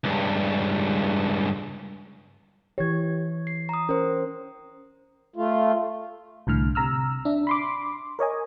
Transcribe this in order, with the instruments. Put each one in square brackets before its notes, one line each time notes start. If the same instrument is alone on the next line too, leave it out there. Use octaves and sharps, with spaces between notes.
[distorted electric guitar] C#2 G2
[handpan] E3 C#5 [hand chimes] G4 G#6
[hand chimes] C7
A#5 D#6
[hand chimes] C#4 C5 [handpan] A#4
[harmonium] A3 F4
[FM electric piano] C2 A2 D3 F6
C3 A#5 E6 F6
D4 E5
B5 C6 D6
A#4 C#5 D#5 G#5